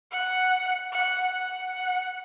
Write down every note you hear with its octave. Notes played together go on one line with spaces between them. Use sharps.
F#5
F#5
F#5
F#5